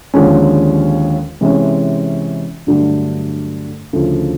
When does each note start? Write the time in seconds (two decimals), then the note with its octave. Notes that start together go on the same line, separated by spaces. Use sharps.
0.14 D#2 D3 F3 G#3 C#4
1.41 C3 E3 G#3 C#4
2.67 G2 D3 F#3 A3 D4
3.93 D2 C#3 F3